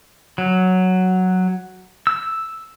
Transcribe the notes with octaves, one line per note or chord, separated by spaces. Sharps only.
F#3
E6